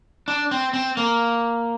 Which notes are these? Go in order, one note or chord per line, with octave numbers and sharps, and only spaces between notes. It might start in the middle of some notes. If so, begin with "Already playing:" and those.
D4
C4
C4
A#3